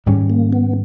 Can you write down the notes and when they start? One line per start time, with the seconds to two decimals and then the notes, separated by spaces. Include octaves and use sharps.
0.06 G#2 D#3 G3 C#4
0.30 A#3
0.53 B3